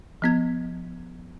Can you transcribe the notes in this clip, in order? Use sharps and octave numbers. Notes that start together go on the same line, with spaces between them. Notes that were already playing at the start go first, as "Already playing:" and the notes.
F3 B3 G#6